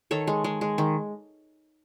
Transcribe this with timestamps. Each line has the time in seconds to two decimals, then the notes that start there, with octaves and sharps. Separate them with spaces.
0.11 D#3 A4 C#5
0.27 G#3
0.44 G#3
0.61 G#3
0.78 D#3